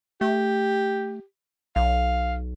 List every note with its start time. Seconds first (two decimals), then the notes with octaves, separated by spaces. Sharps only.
0.21 A3 G4
1.76 B1 F5